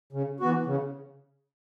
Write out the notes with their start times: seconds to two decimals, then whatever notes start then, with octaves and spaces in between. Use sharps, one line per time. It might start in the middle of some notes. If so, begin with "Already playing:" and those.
0.13 C#3
0.40 E3 B3 F#4
0.66 C#3